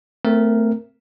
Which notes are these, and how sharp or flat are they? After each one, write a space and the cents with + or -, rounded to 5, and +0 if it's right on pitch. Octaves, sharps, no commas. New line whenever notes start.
A3 +20 C4 -25 A#4 +0